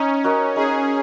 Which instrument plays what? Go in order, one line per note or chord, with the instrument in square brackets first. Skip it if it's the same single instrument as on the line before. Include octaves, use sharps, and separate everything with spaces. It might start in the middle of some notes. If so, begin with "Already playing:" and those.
Already playing: [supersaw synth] C#4 [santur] D#4
[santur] F#4 A#4 D#5
[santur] D#4 [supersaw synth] G#4